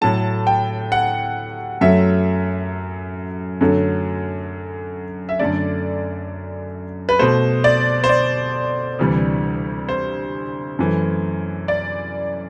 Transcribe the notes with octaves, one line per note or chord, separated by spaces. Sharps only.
A2 F#3 A3 A5
G5
F#5
F#2 F#3 A3 E5
F#2 D3 F#3 A3
E5
F#2 D3 A3 D5
B4
B2 A3 C5
D5
C5
D5
D2 C3 E3 G3
C5
F#2 E3 A3
D5